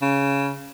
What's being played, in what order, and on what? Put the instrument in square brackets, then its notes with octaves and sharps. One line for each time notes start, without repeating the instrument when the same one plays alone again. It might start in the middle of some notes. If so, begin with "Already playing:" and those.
[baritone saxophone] C#3